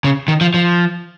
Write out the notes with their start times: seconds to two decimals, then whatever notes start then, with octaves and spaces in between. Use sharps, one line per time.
0.04 C#3
0.28 D#3
0.41 F3
0.54 F3